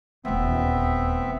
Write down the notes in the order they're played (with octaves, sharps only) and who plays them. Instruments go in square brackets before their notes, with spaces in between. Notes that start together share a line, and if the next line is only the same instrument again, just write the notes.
[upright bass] D#1 D2 [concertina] B3 C4 E5